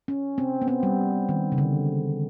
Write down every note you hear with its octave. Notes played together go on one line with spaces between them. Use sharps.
C#4
C4
B3
C4
G3
D#3
C#3
D3